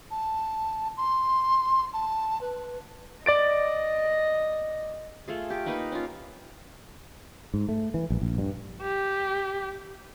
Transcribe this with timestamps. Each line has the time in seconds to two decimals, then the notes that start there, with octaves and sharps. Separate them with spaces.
0.11 A5
0.97 C6
1.93 A5
2.41 B4
3.26 D5 D#5 A6 D7
5.28 A3 F4 G#4
5.50 G4
5.66 A#3 D#4 B4 B5
5.92 C#4 F4
7.54 G#2
7.69 A3
7.94 E3
8.10 A#1
8.22 A#1
8.38 G2
8.81 G4